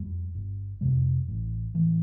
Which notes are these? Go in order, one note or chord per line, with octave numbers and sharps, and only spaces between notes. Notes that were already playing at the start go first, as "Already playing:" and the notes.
Already playing: F2 G3
G1
F2 C3 G3
A1
A2 E3